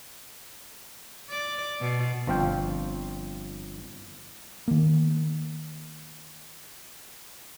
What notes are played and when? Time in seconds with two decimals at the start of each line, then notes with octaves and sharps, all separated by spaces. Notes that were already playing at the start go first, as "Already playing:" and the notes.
1.29 D5
1.81 B2
2.27 G1 F3 C4 F5 G5
4.68 D#3 A#3